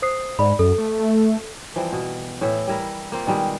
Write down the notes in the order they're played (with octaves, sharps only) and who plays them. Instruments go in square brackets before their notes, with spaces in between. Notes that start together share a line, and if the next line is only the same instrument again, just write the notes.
[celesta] C5 D#6 C7
[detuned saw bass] G#2 [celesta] D5 B5
[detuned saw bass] F#2 [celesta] A4
[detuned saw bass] A3
A3
[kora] E3 F3 G3 C4
B2
A2 E3 E4 E5
G3 E4 A#4
A#3 C4 F4
B2 D#3 G3 G#3